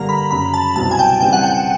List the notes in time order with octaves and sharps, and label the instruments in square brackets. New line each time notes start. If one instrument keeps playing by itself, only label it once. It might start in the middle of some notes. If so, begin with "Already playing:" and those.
Already playing: [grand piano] G2 D3 G3 A#3 [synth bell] A#5
[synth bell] B5
[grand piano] F#2 C#3 F#3 [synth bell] B5
[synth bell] A5
[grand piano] C2 B2 F#3 [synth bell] A5
[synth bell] G#5
G5
[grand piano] C#3 E3 G3 C4 [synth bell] G5
[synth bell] F#5
G5